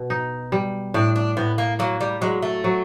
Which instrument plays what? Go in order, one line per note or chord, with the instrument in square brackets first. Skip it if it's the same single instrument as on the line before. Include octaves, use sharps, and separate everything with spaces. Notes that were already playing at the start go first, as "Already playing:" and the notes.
Already playing: [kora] B2
D#4
G3
[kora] A2 [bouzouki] D4
[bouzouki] D4
[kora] A2 [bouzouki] B3
[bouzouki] A#3
[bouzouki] F#3 [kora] A#3
[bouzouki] G3
[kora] F#3 [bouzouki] G#3
[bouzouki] A3
[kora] F#3